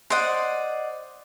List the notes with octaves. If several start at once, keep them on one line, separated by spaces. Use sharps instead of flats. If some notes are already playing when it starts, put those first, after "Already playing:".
C5 D5 D#5 F#5